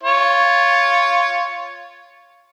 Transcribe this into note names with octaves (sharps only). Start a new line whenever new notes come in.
F4 C#5